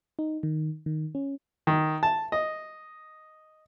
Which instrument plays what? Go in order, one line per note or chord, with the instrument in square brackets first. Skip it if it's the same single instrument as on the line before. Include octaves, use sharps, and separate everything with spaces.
[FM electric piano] D#4
D#3
D#3
C#4
[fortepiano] D#3
A5
D#5